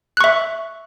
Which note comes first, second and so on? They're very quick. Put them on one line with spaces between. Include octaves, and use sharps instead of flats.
F#6 C#6 E5